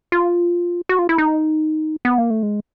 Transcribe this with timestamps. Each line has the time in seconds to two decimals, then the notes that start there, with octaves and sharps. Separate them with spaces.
0.12 F4
0.89 F#4
0.99 F4
1.09 E4
1.18 D#4
2.05 B3
2.18 A#3
2.30 A3
2.43 G#3